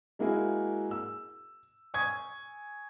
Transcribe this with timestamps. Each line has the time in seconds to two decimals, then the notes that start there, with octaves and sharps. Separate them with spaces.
0.19 G#3 A#3 E4 F#4 G#4
0.91 E6
1.94 G#5 C#6 D#6 G#6